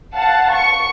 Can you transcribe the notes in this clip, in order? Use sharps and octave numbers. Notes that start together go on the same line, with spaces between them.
F5 F#5 A5
C#6 C#7